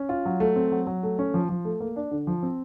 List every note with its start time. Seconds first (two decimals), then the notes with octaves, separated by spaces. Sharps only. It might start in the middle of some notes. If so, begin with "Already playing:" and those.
Already playing: C#4
0.09 F4
0.25 F#3
0.40 A3
0.56 C4
0.72 F#3
0.87 F#3
1.03 A3
1.19 C#4
1.34 F3
1.49 F3
1.65 A3
1.80 A#3
1.96 D4
2.11 D3
2.27 F3
2.43 C4